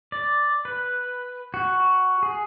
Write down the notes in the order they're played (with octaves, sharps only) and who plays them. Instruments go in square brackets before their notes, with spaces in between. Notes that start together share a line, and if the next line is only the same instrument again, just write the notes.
[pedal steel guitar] D5
B4
F#4
G#4